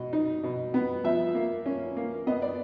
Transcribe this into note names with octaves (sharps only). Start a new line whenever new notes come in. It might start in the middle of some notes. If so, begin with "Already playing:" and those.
Already playing: B2 D#5
D#4
B2
B3
F3 E5
A#3
C#4
A#3
B3 D#5
D5